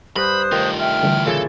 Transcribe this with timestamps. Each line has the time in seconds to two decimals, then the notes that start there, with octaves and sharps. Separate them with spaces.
0.16 G2 B4 C5 B5 D#6 F#6
0.52 D#3 A3 F4
0.78 E5 G5 F6
1.03 D3 E3 G3
1.26 A#2 C#3 E4 A4